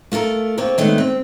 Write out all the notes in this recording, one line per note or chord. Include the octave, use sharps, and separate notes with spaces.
A3 F4 A4 A#4
D2 A#3 C4 F4 C#5
D#3 G#3 A3 B3 C#4 D4
C4